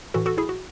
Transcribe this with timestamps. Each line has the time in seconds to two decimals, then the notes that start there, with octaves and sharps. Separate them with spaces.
0.14 A2 E3 F#4 A4
0.26 F#4 A4
0.38 E4 G#4
0.49 F#4